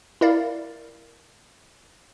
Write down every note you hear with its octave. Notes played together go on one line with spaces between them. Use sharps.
E4 A#4 D5 F5